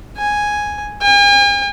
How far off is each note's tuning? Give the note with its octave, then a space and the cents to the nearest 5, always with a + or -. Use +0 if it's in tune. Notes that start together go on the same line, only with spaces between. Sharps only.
G#5 +0
G#5 -45